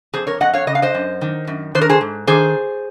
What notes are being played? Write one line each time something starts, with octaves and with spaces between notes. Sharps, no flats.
F2 G#4 C5
A#4 C#5
F2 D#5 F#5
C#5 F5
C#3 D#5
F5
C5 D#5
F#2
D#3
F#2
D#3 C5
A#4
G#4 C5
G#2
D#3 G#4 C5